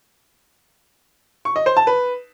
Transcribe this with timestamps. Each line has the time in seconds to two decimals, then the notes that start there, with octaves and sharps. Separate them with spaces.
1.45 C#6
1.56 D#5
1.66 C5
1.77 A5
1.87 B4